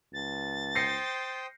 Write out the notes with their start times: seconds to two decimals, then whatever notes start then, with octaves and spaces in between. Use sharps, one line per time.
0.13 C#2 A6
0.75 C5 G5 D#6 A#6 C7 C#7